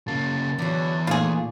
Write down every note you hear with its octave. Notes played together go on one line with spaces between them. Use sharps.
C#3 A#3 A5
E2 D3 F#3
A#2 A3 D#4 F4 G#4